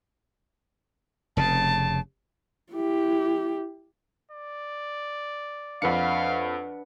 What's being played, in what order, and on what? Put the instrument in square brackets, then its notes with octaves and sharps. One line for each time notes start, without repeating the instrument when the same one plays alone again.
[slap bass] F1 C#3 [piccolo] A5
[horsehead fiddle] E4 G4
[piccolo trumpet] D5
[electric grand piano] F2 C#7 [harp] D4 B4 F#5 [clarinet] F5